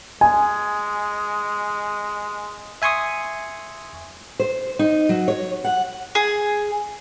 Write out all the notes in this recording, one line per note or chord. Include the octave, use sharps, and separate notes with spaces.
G#3 G#5
E5 G#5 C6 C#6 D#6
C5
D#4
F#3
C#5
F#5
G#4